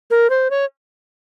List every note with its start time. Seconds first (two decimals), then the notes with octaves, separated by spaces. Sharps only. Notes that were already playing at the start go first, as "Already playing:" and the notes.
0.11 A#4
0.30 C5
0.50 C#5